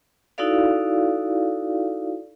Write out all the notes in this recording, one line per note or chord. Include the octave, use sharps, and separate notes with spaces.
D#4 E4 F#4 A4 D5 F5